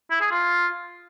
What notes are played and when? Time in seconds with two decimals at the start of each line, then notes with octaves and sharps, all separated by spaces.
0.11 E4
0.21 G#4
0.31 F4